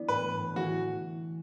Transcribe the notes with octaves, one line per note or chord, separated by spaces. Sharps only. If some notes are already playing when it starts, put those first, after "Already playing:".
Already playing: E3 B3 D4
A2 B4
A3
A2
E3 F#4